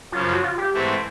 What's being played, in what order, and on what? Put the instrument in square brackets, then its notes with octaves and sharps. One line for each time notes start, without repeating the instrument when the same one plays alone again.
[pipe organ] F#2 C#3 F3 [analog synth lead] F4
[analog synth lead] F4
F#4
F4
G4
[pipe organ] G#2 E3 A3 C4